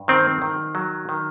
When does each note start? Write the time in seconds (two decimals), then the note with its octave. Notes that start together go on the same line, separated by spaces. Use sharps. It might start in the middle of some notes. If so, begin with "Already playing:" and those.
Already playing: G2
0.08 D#3 C4
0.42 D#3
0.75 F#3
1.09 D#3